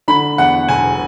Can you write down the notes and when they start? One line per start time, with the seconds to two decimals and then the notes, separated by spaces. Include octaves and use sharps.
0.08 D3 B5
0.38 E2 F#5
0.69 E1 G#5